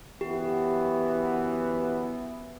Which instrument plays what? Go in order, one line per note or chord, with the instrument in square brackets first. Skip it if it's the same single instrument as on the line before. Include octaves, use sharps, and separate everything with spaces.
[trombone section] F#2 E3 B3 [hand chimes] G4